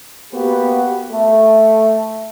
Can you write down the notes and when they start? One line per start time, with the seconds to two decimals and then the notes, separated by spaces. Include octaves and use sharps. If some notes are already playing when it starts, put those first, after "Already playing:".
0.33 A#3 B3 F#4 G4
1.12 A3